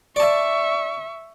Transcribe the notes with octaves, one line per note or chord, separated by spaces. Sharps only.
D5 E5 A5 C#6